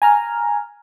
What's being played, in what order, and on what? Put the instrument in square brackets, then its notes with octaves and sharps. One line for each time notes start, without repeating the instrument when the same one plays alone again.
[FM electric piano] G#5 A#5 F6